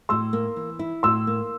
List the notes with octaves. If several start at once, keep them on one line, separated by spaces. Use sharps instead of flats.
A2 C6 E6
A#3
E3
E4
A2 C6 E6
A#3